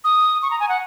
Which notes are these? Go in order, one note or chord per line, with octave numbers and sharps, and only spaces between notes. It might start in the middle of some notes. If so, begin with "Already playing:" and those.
D#6
C#6
A#5
G#5
F#5